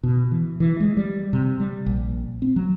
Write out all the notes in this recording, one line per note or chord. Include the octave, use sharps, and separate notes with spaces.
B2
E3
E3
G#3
G3
C3
G3
A#1
C4
F#3